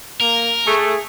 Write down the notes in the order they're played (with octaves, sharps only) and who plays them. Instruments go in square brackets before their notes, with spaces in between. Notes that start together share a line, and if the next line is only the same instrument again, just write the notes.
[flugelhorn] A#3 [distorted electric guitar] A#4
[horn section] A3 [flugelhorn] G#4